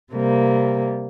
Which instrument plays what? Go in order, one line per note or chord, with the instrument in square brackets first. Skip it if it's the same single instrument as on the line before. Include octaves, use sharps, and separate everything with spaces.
[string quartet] C3 G3 A#3